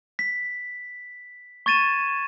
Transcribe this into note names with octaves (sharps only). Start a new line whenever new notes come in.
B6
C#6 G#6 A6 D#7 E7